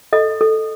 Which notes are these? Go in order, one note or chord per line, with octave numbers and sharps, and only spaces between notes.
A4 D#5
A4